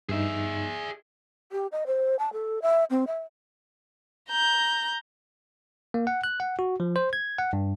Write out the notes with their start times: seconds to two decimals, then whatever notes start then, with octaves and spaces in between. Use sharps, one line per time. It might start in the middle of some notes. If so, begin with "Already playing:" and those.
0.09 G2 D#4 G#4 E5
1.52 G4
1.72 D#5
1.87 C5
2.19 A5
2.33 A4
2.62 E5
2.90 C4
3.07 E5
4.30 A#5 G6
5.94 A#3
6.07 F#5
6.24 F#6
6.40 F#5
6.59 F#4
6.80 F3
6.96 C5
7.13 G#6
7.39 F#5
7.53 G2